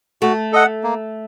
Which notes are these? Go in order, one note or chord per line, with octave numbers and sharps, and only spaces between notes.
A3 F#4
A4 D#5 F#5
A#3